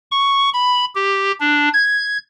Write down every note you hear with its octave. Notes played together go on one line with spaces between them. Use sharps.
C#6
B5
G4
D4
G#6